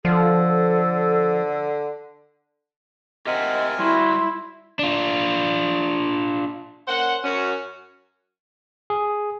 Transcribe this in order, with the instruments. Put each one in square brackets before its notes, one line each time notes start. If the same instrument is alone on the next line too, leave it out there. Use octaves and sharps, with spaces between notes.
[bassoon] D3 [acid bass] F3 [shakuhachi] A4
[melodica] C4 A#4 G#5 [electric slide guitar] G4 E5 F#5 [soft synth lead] D#5
[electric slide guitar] G3 F#4 [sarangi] E4 [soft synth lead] C6
[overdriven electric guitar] D4 F4
[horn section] A#3 C#4 C5 F#5
F#2 C#4 F#4
[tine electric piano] G#4